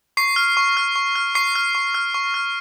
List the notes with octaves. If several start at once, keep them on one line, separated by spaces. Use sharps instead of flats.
C#6 C7
F6
C#6
F6
C#6
F6
C#6 C7
F6
C#6
F6
C#6
F6